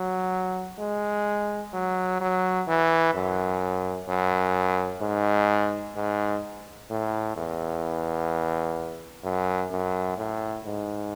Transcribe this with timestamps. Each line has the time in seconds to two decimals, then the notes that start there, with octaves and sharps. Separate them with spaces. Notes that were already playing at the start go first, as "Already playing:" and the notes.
Already playing: F#3
0.79 G#3
1.73 F#3
2.20 F#3
2.68 E3
3.14 F#2
4.09 F#2
5.01 G#2
5.95 G#2
6.90 A2
7.37 E2
9.24 F#2
9.71 F#2
10.17 A2
10.65 G#2